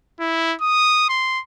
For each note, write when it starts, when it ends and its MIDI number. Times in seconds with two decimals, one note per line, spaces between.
0.20 0.54 64
0.61 1.07 87
1.09 1.41 84